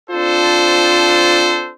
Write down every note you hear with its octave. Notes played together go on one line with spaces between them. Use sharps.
C4 D4 F4 A4 C5